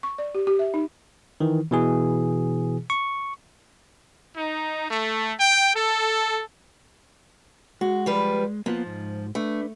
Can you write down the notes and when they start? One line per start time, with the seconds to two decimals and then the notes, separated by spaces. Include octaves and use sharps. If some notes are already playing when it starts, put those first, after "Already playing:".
0.03 C#6
0.18 D5
0.35 G4
0.47 G4
0.59 E5
0.74 D#4
1.40 D#3 E3
1.71 B2 E3 G#4
2.90 C#6
4.37 D#4
4.88 A3
5.39 G5
5.75 A4
7.81 G#3 F#4
8.06 F3 G3 B4
8.66 F3 A#3 B3 F4
8.86 G#2
9.35 A3 D4 B4